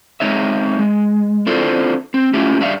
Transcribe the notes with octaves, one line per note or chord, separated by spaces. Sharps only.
G#3 C4 D#4 C#5 E5
G#3
C4 D4 E4 F4 A4 C5
C4
A3 C#4 E4 F4 G4
G2 D4 E5 F5